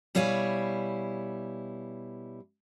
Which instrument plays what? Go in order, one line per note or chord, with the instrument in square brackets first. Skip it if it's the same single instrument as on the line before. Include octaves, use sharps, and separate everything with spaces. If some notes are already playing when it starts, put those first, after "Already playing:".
[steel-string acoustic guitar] B2 G3 E4 C#5 F5 G#5